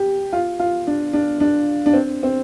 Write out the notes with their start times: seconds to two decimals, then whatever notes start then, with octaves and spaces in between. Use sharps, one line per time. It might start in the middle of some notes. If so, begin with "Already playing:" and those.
Already playing: G4
0.33 F4
0.59 F4
0.87 D4
1.13 D4
1.40 D4
1.86 D4
1.93 C4
2.23 C4